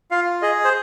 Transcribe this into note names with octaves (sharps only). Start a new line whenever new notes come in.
F4 F5
G#4 D#5
C5